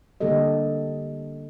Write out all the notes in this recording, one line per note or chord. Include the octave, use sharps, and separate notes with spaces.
D3 G3 A#3 G4 A4 D#5